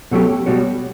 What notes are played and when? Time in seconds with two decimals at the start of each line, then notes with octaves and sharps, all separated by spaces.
0.11 B2 F#3 A3 C#4 G4
0.46 B2 G3 B3 F#4 C#5